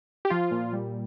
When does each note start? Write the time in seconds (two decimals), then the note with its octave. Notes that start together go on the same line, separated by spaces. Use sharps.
0.25 G4
0.30 F3 F4
0.51 A#2
0.73 G3